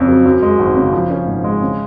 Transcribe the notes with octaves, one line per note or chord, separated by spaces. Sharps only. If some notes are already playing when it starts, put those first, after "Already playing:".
Already playing: F2 C#3 C#4
F#3
F#2
G#3
G#1
C#3
F3
C#4
G#2
G#3
C#3